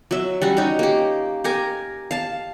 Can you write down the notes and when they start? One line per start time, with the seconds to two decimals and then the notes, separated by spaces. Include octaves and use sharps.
0.11 F#3 E5
0.42 G3 C#4 F#4
0.57 C#4 D#4 G4
0.79 A#3 G4
1.44 G4 A#4 G#5
2.11 F5 A5